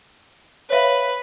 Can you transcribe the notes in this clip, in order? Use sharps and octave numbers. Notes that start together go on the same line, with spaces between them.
B4 C#5 E5 F5